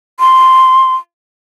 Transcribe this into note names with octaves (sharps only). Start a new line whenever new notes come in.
C6